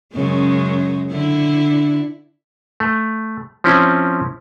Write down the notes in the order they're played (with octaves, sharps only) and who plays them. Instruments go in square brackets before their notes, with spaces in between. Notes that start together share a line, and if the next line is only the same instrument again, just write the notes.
[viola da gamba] F#2 C#3 G#3
D3 E4
[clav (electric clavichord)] A3
F3 C4 C#4 E4